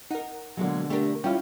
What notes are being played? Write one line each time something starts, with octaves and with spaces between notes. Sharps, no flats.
D#4 A#4 F#5
B2 D3 F#3 G#3 A#3
A3 D4 G4 A#4
G3 C#4 E4 F4 G5